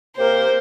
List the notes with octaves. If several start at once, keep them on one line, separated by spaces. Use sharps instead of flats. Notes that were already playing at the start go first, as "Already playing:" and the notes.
C3 A#3 G4 A#4 C5